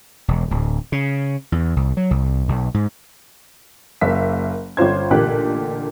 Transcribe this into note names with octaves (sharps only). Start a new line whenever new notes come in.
E1
D1
C#3
E2
C2
F#3
C2
B1
G#2
F#1 A#3 E5 F5 B6
G1 C#4 F4 C5 G#6
A1 A#2 D3 A#3 G4 F#6